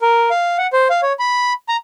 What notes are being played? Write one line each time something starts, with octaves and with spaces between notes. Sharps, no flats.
A#4
F5
F#5
C5
F5
C#5
B5
A#5